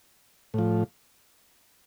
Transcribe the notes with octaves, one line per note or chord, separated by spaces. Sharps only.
A2 F3